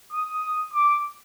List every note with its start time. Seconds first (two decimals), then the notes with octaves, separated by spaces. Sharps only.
0.13 D#6
0.74 D6